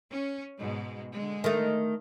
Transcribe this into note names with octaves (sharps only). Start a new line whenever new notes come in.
C#4
G#2 B2 G#3
D3 G#3
D#3 A3